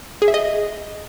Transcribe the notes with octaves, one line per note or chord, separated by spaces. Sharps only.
G#4
E5
D#5